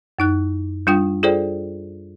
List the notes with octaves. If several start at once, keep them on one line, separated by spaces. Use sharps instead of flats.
F#2 D#4 F#6
G3 D4 F4 G5 D#6
F4 G#4 A4 C5 D5 G5